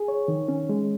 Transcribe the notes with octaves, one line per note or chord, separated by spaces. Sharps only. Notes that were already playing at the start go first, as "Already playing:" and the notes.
Already playing: G#4
C#5
D#3
C#4
G#3